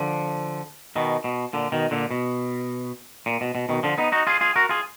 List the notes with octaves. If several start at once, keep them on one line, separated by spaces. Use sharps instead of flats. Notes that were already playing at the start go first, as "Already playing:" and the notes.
Already playing: D3 F3
B2 D#3
B2
A#2 D3
B2 D#3
A#2 D3
B2
A#2
B2
B2
B2 D#3
D3 F3
B3 D#4
D#4 F#4
F4 G#4
F4 G#4
F#4 A#4
F4 G#4